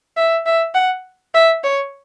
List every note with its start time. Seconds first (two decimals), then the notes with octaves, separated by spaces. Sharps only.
0.17 E5
0.46 E5
0.75 F#5
1.34 E5
1.64 C#5